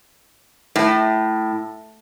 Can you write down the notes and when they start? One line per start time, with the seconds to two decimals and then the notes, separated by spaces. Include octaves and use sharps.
0.76 A2